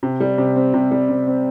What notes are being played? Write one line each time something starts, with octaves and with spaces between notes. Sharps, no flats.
C3
G3
C3
C4
C3
G3
C3
C4